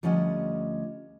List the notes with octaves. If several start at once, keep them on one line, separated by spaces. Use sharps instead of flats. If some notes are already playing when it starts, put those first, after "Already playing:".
D2 F3 G3 C#4 D#5 F#5